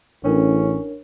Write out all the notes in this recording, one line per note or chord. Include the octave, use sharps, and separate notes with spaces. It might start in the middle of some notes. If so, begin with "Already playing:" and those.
A1 C#4 D4 A#4 C#5